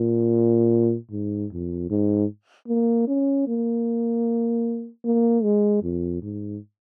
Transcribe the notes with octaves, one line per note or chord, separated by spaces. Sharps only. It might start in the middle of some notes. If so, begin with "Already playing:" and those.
Already playing: A#2
G#2
F2
G#2
A#3
C#4
A#3
A#3
G#3
F2
G#2